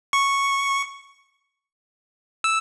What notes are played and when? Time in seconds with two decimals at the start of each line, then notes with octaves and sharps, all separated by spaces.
0.13 C#6
2.44 E6